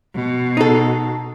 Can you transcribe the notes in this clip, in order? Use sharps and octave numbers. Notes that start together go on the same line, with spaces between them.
B2
D#4 A4